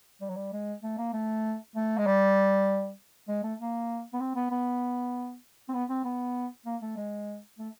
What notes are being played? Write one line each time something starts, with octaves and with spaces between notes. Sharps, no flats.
G3
F#3
G3
G#3
A3
A#3
A3
A3
G#3
G3
G#3
A3
A#3
B3
C4
B3
B3
C4
B3
C4
B3
A#3
A3
G#3
A3